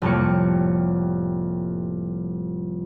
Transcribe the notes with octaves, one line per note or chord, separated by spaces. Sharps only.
F1 A2 G3 A#3 C#5 C#7